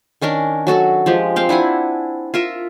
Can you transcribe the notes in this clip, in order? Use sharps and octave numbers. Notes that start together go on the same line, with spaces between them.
D#3 C#4 D4 A#4
F#3 F#4 A4 A5
F3 G#3 G4
C4 F5 G5
D4 E4 F#5 G#5
F4 A#4 E5